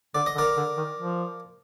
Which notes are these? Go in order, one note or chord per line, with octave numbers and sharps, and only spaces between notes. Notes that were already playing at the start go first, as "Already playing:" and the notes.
D3 D5
D#5
D3
A#4 D5
D3
D#3
F3